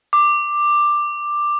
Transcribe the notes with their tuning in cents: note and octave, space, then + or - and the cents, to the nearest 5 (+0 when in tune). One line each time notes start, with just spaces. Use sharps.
D6 +10